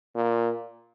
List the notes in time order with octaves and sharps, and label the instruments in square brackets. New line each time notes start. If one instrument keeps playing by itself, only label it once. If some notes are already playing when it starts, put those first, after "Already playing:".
[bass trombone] A#2